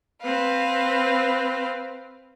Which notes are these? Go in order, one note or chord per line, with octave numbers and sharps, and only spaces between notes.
C4 B4 F5